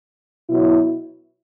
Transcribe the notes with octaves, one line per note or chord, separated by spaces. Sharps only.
B2 F#3 E4